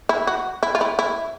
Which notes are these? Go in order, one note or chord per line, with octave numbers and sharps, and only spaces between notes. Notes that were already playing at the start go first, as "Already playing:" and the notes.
E4
F#4
E4
F4
E4
E4